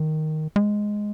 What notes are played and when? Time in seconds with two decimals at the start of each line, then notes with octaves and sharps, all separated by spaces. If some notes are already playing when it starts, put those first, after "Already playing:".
Already playing: D#3
0.56 G#3